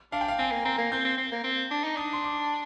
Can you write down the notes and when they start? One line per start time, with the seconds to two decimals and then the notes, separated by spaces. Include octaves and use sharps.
0.12 D4 F5
0.21 G5
0.28 F5
0.39 C4 G#5
0.51 A#3
0.65 C4 A#5
0.78 A#3
0.92 C4 G6
1.05 C4
1.17 C4
1.32 A#3
1.44 C4
1.71 D4
1.84 D#4
1.97 D4 D#6
2.13 C6
2.24 D6